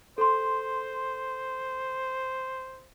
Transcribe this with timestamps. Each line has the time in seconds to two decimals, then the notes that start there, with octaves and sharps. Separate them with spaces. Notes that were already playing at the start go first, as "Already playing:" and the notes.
0.18 A4 C5 C6